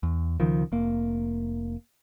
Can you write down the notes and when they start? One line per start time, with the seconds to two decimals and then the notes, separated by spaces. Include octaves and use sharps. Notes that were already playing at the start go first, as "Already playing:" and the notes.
0.03 E2
0.40 C#2 D#3 F3
0.72 F1 A#3